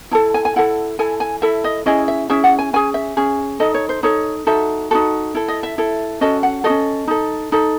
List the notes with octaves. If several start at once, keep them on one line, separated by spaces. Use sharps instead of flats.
E4 A4 A5
G#5
G#5
E4 A4 F#5
E4 A4 G#5
G#5
E4 A4 E5
D#5
C#4 E4 G#4 D#5
E5
C#4 E4 G#4 E5
F#5
G#5
C#4 G#4 G#5
E5
C#4 G#4
D#4 A4 D#5
C#5
C5
D#4 A4 C#5
D#4 F#4 A4 E5
D#4 F#4 A4
E4 A4
D#5
E5
E4 A4
C#4 F#4 A4 D#5
F#5
F#4 A4 D#5
C#4
D#4 A4
D#4 A4